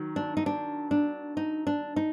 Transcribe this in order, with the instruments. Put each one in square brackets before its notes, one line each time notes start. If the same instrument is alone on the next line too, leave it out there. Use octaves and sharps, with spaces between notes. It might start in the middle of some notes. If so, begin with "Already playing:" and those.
Already playing: [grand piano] D#3 F#3
[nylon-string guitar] D4
D#4
D4
D4
D#4
D4
D#4